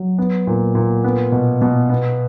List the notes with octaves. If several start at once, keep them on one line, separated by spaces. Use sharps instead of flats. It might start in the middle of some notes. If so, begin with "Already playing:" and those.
Already playing: F#3
B3
A#2
A#2
B3
B2
B2
B3